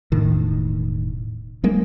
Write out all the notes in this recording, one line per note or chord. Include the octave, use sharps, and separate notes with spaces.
E1 A2 D#3
F#3 G#3 A#3